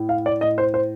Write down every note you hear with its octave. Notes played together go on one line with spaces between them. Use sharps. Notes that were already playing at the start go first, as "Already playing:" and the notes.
Already playing: A2
F5
D5
A2 D#5
C5
C5